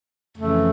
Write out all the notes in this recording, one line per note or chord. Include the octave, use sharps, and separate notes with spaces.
F2 C#3 E3 A3